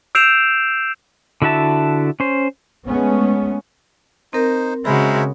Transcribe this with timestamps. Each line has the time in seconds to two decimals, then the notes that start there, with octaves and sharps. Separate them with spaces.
0.15 E6 G6 C7 D7 E7 F7
1.42 D3 E4 F#4 E5 A5
2.20 C#4 C5
2.88 G#3 A3 B3 C#4
4.33 C4 D#4 A#4 C5
4.85 C#3 G#3 F#4 A#4 C5 E5 B5